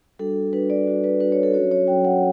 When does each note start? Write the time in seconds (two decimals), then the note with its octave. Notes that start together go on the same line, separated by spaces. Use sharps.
0.19 G3 D4 F#4 A4
0.53 G3 D4 F#4 B4
0.70 D5
0.87 G3 D4 F#4
1.04 B4
1.20 G3 D4 F#4 B4
1.32 C#5
1.43 A4
1.54 F#3 C#4 F#4 C#5
1.71 C#5
1.88 F#3 C#4 F#4 G5
2.05 F#5